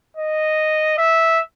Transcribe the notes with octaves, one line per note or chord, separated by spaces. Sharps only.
D#5
E5